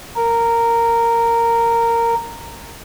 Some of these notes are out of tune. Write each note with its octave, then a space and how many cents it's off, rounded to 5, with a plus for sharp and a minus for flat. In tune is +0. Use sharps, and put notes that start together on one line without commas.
A#4 -10